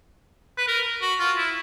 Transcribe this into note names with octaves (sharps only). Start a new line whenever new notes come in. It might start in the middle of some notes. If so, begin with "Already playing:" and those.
B4
A#4
F#4
F4
E4